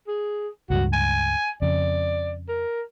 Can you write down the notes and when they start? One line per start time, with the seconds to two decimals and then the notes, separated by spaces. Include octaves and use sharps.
0.08 G#4
0.70 C#2 G2 F#4
0.93 G#5
1.62 F2 C#3 D5
2.48 A#4